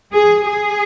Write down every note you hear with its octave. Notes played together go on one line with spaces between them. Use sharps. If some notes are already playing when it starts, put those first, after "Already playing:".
G#4
G#4